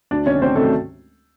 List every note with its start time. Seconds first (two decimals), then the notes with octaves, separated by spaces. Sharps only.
0.11 D2 D4 D5
0.26 C3 D#3 F#3 C#4 C#5
0.41 D2 C4 C5
0.56 C3 D#3 F#3 A3 A4